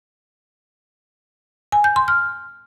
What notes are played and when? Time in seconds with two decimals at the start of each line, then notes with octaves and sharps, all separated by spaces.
1.72 G#5
1.84 G6
1.96 C6
2.08 F6